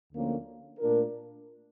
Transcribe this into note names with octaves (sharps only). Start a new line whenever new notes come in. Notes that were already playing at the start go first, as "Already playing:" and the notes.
D2 D3 F3 A#3 C#4
A#2 A3 D4 F4 A#4